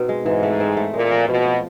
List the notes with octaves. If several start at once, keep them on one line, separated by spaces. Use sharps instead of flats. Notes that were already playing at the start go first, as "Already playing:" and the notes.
Already playing: B2 C4 D#4
G#3
G#2 E3
A3
C4
A3
A#2 G#3
F3
B2 F3
F3